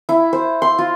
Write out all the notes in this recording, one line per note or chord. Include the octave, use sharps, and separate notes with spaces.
E4
C5
C6
F4